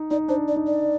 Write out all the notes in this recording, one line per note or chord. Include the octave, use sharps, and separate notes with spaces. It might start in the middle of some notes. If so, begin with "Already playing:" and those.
Already playing: D#4
D#4 D5
D4 C5
D5
D#4
D5